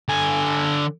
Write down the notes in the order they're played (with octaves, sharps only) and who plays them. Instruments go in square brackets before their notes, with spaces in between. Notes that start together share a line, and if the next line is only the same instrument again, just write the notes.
[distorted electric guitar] D3 G#5